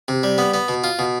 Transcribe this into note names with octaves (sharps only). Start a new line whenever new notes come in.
C3
G3
B3
B3
B2
F4
B2